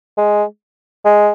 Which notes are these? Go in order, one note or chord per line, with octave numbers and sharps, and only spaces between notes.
G#3
G#3